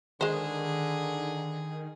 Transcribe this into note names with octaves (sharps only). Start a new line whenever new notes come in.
D3 D#3 G#3 G#4 C5